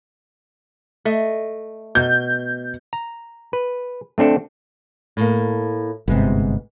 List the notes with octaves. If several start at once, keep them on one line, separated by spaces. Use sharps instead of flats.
A3 D#5
B2 G6
A#5
B4
A3 C4 D4 A4 E5
A2 A#3
G1 G#2 C3 G#3 B3